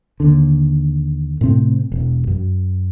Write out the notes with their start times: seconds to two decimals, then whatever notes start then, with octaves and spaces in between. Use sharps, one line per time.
0.20 D#2 D3
1.41 A2 C3 C4
1.92 E1
2.27 F#2